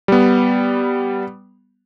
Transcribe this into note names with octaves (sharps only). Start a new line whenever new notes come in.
G3 B3